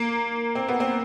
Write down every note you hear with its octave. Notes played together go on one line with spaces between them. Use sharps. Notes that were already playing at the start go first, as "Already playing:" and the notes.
Already playing: A#3
C4
B3
C4